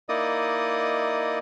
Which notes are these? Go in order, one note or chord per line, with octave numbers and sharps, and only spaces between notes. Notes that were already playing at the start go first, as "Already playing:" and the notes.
A#3 D#4 E4 D5 D#5 D#6